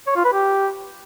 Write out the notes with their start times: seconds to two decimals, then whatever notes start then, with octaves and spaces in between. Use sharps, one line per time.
0.07 C#5
0.16 F4
0.24 B4
0.33 G4